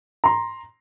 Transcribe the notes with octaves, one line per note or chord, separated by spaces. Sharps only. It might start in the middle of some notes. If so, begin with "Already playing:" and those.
A#5 C6